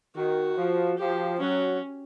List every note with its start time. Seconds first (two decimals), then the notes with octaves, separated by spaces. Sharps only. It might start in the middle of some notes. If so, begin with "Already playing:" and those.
0.15 D#3 F#4
0.57 F3
0.98 F3 G4
1.39 F#3 C#4